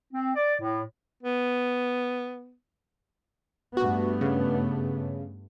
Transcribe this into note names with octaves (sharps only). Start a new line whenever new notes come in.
C4
D5
A2
B3
G2 A3 B3 F#4
C#3